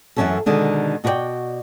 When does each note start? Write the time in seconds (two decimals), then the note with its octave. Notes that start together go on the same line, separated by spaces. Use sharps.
0.16 F#2 E3 A3 C#4 F#4 A4
0.46 B2 D3 D#3 G#3
1.04 B2 F#4 A#4 B4 D5 G5